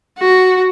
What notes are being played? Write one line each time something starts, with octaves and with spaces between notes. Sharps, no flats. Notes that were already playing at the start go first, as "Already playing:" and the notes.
F#4